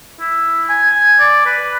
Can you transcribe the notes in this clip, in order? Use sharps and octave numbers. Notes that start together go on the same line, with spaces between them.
E4
G#5
G#5
D5
B4